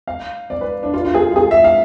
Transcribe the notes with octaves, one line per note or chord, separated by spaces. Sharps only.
F5
D5
B4
D4
F4
F4
G#4
F4
G#4
E5
F5